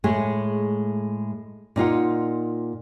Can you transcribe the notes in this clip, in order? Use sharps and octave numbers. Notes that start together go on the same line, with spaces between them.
A2 G#3 A3 G#4
A#2 D#4 F4 F#5